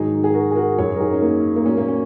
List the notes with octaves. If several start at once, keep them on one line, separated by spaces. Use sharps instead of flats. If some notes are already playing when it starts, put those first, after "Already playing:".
Already playing: G#2 D#3 F#3 D#4 G#4
G#4
F#4 A#4
G#4
F#4 A#4
F#2 F#3 G#4 C#5
A#4
D#4 G#4
C#4
A#3 D#4
A#3
A#2 F#3 C#4
A#3
C#4